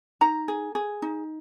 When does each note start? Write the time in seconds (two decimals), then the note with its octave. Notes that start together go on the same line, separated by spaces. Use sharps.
0.21 D#4 A#5
0.48 G#4
0.75 G#4
1.02 D#4